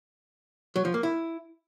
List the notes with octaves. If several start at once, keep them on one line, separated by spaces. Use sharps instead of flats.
F#3
F3
A#3
E4